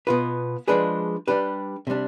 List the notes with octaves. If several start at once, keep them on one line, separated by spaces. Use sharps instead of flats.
B2 B3 F4 B4
F3 G#3 D4 G#4 B4
G3 D4 G4 B4
C3 G3 D4